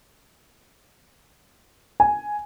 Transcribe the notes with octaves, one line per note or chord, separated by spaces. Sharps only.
G#5